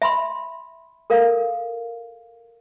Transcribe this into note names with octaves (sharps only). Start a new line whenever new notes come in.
E5 B5 C6
A4 A#4 F5